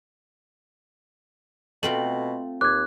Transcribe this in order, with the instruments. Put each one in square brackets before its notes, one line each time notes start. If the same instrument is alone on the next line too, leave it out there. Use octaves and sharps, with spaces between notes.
[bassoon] B2 [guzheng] A3 C4 F4 [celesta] F#7
[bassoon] D#2 [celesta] D6 G#6 [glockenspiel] F#6